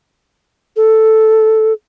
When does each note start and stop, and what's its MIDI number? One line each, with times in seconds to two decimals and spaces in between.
0.76 1.73 69